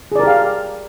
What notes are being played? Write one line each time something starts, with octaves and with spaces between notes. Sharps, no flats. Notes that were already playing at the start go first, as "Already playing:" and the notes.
G4 G#4 A#4 D5 F5